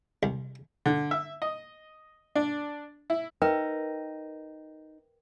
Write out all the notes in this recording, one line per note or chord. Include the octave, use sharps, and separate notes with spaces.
C2
D3
E5
D#5
D4
E4
D#4 A#4 B4 G5